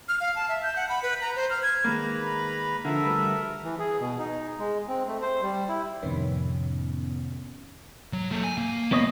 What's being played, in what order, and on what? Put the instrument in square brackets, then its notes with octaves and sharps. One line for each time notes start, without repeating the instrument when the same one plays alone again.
[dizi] F6
F5
A5
E5
G6
F#5
B5
B4
A#5
C5
F6
G#6
[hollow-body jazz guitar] D#3 G#3 A#3 [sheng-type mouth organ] B4 A#5 B5
[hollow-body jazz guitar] D3 F3 [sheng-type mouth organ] A4 A#4 E5
[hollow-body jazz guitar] D2 G3 B4
[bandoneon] E3
G#4
B2
D#4
G#3
C4
A3
C5
G3
E4
[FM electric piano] F2 A2 C3 D#3 B3 C#4
[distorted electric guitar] F#3
A#3 A4
G#5
A#3
[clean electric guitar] B3 C#5 D#5